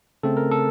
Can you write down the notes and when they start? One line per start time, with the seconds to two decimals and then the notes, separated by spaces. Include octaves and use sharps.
0.23 C#3 A3 C4 A4
0.37 A#4
0.51 A4